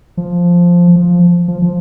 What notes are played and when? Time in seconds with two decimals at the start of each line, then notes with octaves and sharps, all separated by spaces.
0.17 F3
0.96 F3
1.48 F3
1.62 F3